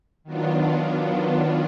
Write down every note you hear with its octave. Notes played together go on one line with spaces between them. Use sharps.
D#3 F#3 B3 D4 F4